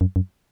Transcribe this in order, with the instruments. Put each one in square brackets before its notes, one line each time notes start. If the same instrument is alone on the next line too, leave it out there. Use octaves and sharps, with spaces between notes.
[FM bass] F#2
F#2